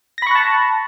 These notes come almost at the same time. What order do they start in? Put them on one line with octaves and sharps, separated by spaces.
A#6 B5 C#6 F#6 A5